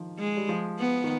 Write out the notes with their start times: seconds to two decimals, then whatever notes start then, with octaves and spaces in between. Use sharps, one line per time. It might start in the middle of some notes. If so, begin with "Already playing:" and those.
Already playing: D#3 F3
0.18 G#3
0.37 G3
0.49 F3
0.79 B3
1.04 D#3